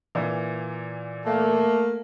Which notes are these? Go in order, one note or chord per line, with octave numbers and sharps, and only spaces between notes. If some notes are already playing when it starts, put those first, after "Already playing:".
A#2 E3
A3 A#3